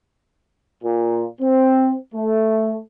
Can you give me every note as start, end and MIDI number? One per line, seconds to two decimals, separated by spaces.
0.83 1.25 46
1.41 1.96 60
2.14 2.79 57